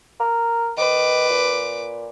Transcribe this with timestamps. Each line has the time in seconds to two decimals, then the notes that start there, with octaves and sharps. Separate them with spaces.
0.20 A#4
0.77 D#3 B4 D6
1.29 A#2